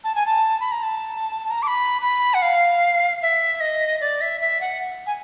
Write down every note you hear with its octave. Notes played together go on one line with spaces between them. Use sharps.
A5
G#5
A5
B5
A#5
A5
A#5
D6
B5
B5
F#5
F5
E5
D#5
D5
E5
E5
F#5
G#5